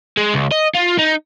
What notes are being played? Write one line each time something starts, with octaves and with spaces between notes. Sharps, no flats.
G#3
C#2
D#5
F4
D#4